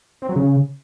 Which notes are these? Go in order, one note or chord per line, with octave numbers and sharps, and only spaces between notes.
C4
F#3
C#3